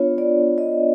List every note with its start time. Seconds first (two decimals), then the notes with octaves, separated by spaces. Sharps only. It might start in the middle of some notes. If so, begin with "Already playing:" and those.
Already playing: B3 D4 F4 C#5
0.18 D5
0.58 D#5